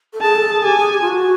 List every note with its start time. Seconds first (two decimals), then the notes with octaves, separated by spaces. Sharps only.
0.13 A4
0.21 G#4 A5
0.35 A4
0.50 G#4
0.64 G4 G#5
0.78 G#4
0.92 G4
1.01 F4
1.07 F#4